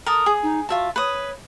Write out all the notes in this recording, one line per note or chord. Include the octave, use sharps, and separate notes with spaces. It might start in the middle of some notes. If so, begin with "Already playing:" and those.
A4 A#4 D#6
G#4
D#4
F4 F#4 E5 A5
B4 C#5 D#6